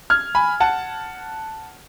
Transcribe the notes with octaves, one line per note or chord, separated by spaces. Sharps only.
F6 G#6
G#5 B5
F#5 A5